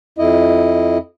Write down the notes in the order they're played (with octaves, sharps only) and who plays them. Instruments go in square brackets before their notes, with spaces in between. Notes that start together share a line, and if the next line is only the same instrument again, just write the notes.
[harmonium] F2 E4 D#5